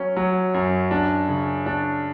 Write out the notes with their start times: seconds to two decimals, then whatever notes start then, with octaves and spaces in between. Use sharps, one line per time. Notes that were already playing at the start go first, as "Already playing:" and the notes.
Already playing: F#3 C#4
0.16 F#3
0.54 F#2
0.91 D4
1.29 C#3
1.66 D4